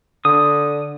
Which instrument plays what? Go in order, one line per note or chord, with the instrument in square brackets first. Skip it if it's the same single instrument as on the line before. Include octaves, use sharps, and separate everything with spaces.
[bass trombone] D3 [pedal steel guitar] D#6